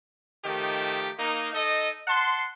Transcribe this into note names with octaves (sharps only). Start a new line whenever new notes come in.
D#3 F3 A3 D#4 G4
A#3 D#4
D#4 A4 D#5
F#5 A5 C6